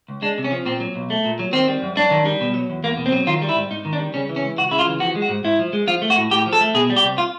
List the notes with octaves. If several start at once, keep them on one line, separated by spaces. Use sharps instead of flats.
C#2
G#3 D4
C3
C#4
F3
A#2 C4
F#3
B1
A3
A#2
F#3
D#3 C4
G3
F#2
F#2 D4
D#3
G3
B2
F#3
E2
E2 A#3
B2
C4
F#3
D#3 F4
G3
E4
G#2
G#2 D#4
D#3
D4
G3
C#3 C#4
E3
C#4
C#2
C#2 F#4
C#3 E4
F4
E3
F3 F#4
G#3
F#4
G#2
G#2 E4
F3
G#3
F3 F4
A3
F#4
A2
A2 G4
F3
A4
A3
B2 G#4
G3
G4
C2
F4